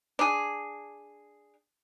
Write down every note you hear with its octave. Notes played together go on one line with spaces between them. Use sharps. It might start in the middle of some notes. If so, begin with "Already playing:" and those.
D4 G#4